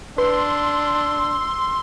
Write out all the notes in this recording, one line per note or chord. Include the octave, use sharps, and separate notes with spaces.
D4 B4 C6 E6